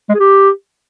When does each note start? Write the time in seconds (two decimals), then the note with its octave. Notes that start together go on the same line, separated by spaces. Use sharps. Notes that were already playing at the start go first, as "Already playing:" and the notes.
0.09 G#3
0.15 G#4
0.20 G4